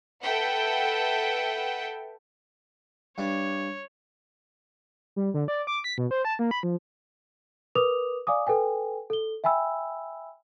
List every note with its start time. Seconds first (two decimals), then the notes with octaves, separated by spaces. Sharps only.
0.23 A4 B4 E5 F#5 G5
3.18 G2 D4 C#5
5.16 G3
5.34 D3
5.48 D5
5.67 D6
5.84 B6
5.98 B2
6.11 C5
6.25 A5
6.39 A#3
6.51 B5
6.63 F3
7.75 A#4 B4 D6 D#6 F7
8.27 D5 F5 G#5 D6 D#6
8.47 A4 B4 G5 G#5
9.10 A4 G7
9.44 E5 G5 G#5 B5 E6